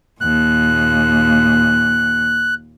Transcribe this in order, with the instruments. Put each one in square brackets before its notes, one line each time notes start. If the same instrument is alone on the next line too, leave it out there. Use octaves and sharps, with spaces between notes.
[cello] D#2 A#2 [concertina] F#6